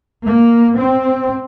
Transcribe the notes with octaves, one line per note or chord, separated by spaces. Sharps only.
A#3
C4